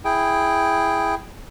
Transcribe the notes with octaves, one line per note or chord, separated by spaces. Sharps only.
E4 G#4 G5